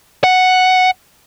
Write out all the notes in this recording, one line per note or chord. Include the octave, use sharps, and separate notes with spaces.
F#5